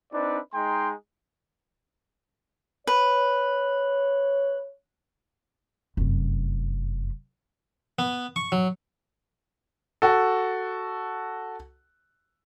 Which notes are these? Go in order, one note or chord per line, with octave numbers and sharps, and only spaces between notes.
C4 D4 D#4 B4 D5
G#3 D#4 G5 A#5 C6
B4 C#5
F1 F#2
B3
C#6
F#3
F#4 A4